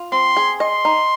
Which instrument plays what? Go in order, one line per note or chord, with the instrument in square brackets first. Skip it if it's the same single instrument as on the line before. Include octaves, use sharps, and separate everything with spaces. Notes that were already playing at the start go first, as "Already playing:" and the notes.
Already playing: [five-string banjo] F4
[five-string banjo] C4 [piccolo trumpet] C6
[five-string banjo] G#4
[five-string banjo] D#5 [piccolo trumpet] C6
[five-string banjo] D#4